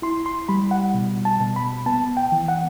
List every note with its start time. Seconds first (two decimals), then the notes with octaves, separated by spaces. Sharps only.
0.02 E4 C6
0.26 C6
0.49 G3 B5
0.71 F#5
0.94 B2
1.25 A5
1.40 B2
1.56 B5
1.86 B3 A5
2.17 G5
2.32 E3
2.48 F#5